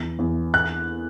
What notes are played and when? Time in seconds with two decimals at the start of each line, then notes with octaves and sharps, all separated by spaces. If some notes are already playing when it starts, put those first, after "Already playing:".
Already playing: E2
0.19 E2
0.54 F#6